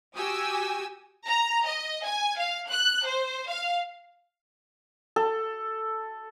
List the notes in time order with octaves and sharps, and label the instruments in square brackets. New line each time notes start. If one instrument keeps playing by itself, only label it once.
[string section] F#4 G4 G#5 D#6 E6
[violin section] A#5
D#5
G#5
F5
F#6
C5
F5
[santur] A4